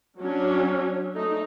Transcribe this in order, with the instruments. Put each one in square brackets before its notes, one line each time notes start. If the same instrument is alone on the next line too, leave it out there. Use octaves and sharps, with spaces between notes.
[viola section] F#3 C#4 D4
A3 D#4